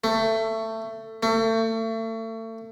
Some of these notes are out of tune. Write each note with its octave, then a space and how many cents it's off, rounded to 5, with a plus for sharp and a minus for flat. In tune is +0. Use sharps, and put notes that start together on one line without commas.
A3 +20
A3 +35